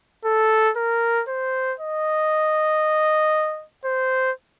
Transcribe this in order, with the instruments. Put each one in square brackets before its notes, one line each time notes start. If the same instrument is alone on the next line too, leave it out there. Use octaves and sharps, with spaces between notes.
[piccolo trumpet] A4
A#4
C5
D#5
C5